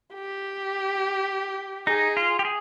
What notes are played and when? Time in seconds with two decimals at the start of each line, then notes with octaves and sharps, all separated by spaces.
0.14 G4
1.87 D#4 G#4
2.17 F4
2.39 G4
2.45 G#4